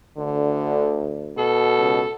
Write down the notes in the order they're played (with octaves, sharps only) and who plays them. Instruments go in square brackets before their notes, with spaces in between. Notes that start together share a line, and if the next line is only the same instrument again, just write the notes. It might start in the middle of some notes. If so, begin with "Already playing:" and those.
[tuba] D2 [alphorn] D3
[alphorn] B2 [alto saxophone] A4
[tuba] C#2